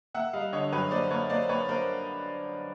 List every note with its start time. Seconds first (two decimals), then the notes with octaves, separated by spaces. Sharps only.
0.15 A#3 E5 F#5
0.33 G3 D#5 F5
0.52 D3 C#5 D#5
0.72 F#2 B4 C#5
0.91 A#3 C5 D5
1.11 A#3 B4 C#5
1.30 A#3 C5 D5
1.49 A#3 B4 C#5
1.68 A#3 A#4 C5